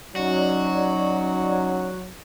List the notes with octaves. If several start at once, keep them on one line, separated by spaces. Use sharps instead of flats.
F#3 C#4 D#4 F#4 D5